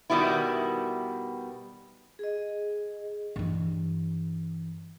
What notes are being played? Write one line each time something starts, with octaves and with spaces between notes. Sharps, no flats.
B2 D#3 G3 B3 E4
G#4 D#5
G2 E3